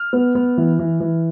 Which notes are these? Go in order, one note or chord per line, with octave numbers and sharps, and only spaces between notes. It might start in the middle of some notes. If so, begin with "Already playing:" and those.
Already playing: F6
B3
B3
E3
E3
E3